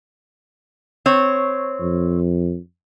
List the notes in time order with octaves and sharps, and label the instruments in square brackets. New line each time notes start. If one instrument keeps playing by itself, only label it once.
[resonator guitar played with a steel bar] C4 C#5
[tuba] F2